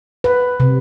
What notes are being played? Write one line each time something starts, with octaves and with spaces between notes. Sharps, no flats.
B4
C3